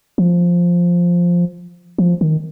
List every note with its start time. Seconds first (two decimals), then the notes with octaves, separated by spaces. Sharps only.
0.18 F3
1.98 F3
2.21 D#3